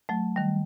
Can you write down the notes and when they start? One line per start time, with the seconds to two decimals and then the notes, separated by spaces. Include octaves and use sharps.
0.09 F#3 A3
0.36 D#3 G3